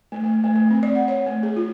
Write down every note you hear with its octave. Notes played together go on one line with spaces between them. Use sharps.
A3
A3
A3
A3
C4
D5
F#5
C#5
A3
G#4
F4